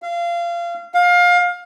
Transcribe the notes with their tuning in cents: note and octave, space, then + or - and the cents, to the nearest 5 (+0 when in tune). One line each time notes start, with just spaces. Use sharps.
F5 -25
F5 +25